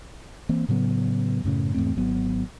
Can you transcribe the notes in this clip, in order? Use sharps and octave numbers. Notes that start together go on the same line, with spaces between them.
E3 A#3 C4
A2 C#3 F#3 B3
F#2 A2 C#3
E2 G#2 A3 C4
G#1 F#3 B3